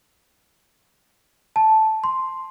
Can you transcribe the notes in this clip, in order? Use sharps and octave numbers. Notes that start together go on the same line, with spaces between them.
A5
C6